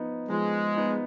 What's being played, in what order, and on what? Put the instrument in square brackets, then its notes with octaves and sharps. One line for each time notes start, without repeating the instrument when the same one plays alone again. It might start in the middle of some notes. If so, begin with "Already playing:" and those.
Already playing: [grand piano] F3 B3 D#4
[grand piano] F3 [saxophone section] G#3
[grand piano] B3 D#4